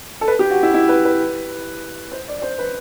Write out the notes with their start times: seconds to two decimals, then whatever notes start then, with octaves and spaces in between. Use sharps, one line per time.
0.21 A4
0.27 B4
0.39 G4
0.50 F#4
0.63 E4
0.74 E4
0.89 B4
1.05 B4
2.11 C5
2.28 D5
2.38 D5
2.42 C5
2.58 B4